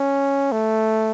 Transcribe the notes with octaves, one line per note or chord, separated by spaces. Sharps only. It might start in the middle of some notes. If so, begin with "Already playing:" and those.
Already playing: C#4
A3